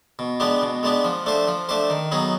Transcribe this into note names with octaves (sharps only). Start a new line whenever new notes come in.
B2
G#3 B3 D4 G4
B2
G#3 B3 D4 G4
F3
A3 D4 G4 C5
F3
A3 D4 G4 C5
D#3
F#3 B3 D#4 G#4